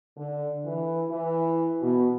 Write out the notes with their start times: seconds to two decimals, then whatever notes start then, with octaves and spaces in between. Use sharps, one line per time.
0.17 D3
0.66 E3
1.11 E3
1.81 B2